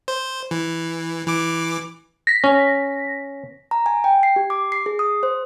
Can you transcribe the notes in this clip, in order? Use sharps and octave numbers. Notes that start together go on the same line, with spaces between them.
C5
E3
E3 D6
A#6 B6
C#4
A#5
G#5
G5
C7
G4
D6
C7
G#4
D#6
C5